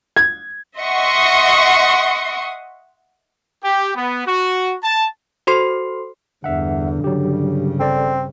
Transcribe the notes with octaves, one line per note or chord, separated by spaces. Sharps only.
G#6
D#5 E5 F#5 C6 C#6 D#6
G4
B3
F#4
A5
F#4 A4 C5 C6 C7
E2 G2 D3 E5 F#5
G2 C#3 F#3 G4
G#1 C4 A4 D5